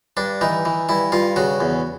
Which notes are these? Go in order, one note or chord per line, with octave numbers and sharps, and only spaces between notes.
G2 D4
E3 D#4
E3
G2 E4
G2 F4
C#3 F#4
E2